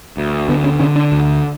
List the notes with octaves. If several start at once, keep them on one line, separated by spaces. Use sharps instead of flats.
D2
D3 B3
C#4
D3 C#4
D4
D2